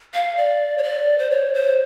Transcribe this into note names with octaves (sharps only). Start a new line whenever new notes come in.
F5
D5
C#5
D5
C5
C#5
C5